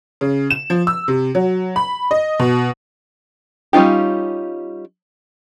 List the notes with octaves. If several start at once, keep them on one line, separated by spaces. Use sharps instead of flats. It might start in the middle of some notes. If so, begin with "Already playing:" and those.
C#3
E7
F3
E6
C3
F#3
B5
D#5
B2
G3 C#4 D#4 F4 G4